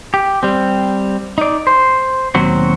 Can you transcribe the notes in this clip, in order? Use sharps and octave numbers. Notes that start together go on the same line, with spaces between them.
G4
G3 C4
D#4 D5
C5
D#2 B2 F#3 C4 F#4